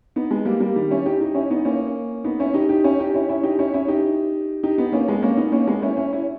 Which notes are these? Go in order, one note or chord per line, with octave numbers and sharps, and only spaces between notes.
B3 D#4
G#3 B3
G3 A#3
G3 A#3
D#3 G3
C#4 E4
D#4 G4
D#4 G4
C#4 E4
B3 D#4
A#3 C#4
B3 D#4
C#4 E4
D#4 G4
D#4 G4
C#4 E4
D#4 G4
C#4 E4
C#4 E4
D#4 G4
C#4 E4
C#4 E4
D#4 G4
D#4 G4
B3 D#4
A#3 C#4
G#3 B3
A#3 C#4
B3 D#4
A#3 C#4
G#3 B3
C#4 E4
C#4 E4
C#4 E4